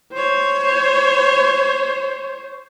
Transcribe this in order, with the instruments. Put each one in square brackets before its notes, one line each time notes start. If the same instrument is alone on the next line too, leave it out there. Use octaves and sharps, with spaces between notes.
[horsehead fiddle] C5 C#5